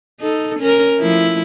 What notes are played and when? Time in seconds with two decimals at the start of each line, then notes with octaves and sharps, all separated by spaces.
0.21 D#4 A4
0.60 C#4 A#4
0.99 F3 A3 E4